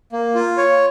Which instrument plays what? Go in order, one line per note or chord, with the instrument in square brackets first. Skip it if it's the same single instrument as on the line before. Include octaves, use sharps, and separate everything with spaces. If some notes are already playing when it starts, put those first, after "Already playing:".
[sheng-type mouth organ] A#3
F4
C#5